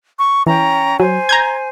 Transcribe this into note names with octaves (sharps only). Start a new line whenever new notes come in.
C#6
E3 C#4 G5 A#5
F#3 C5 G#5
A#5 G6 G#6